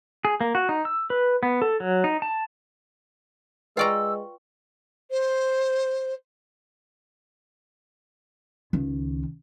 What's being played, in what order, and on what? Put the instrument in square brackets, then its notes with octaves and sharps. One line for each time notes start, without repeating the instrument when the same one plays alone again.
[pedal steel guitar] G#4
A#3
F#4
D#4
E6
B4
B3
A4
F#3
D#4
A5
[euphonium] G#3 [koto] F4 D5 A#5 [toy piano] B4 G5 C#6 [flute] E6
[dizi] C5
[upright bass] C#2 D#3